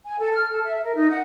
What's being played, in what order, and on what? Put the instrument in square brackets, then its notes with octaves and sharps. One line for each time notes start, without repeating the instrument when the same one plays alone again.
[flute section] G#5
A4
F6
A4
E5
A#4
D#4
F#5